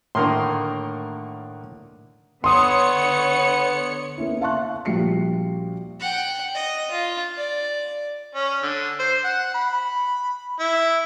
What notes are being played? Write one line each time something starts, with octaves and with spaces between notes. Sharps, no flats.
A2 D3 D#3 A#3 A#4 C6
D3 B3 C#5 C6 D#6 C#7
A#3 B3 C#4 E4
E5 F5 A5 C6 C#6 F#6
A#1 F3 G3 F#4 C7 C#7
F#5 G5
D#5
F4
D5
C#4
D3
C5
F#5
B5
E4